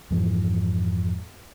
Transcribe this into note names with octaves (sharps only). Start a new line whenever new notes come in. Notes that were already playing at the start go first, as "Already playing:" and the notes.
F2 G#2 E3 F3